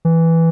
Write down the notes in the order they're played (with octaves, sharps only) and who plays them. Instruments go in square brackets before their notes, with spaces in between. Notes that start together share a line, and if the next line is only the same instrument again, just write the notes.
[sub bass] E3